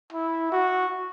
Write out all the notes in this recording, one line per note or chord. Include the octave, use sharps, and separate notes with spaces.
E4
F#4